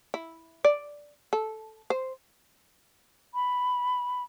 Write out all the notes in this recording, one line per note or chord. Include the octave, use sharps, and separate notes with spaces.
E4
D5
A4
C5
B5